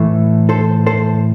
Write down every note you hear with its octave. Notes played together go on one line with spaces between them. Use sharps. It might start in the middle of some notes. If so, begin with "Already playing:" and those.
Already playing: A2 E3 A3
A4 C5
A4 C5